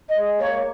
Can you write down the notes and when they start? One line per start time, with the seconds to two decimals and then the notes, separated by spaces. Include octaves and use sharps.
0.09 D#5
0.16 G#3
0.39 A#3 C#5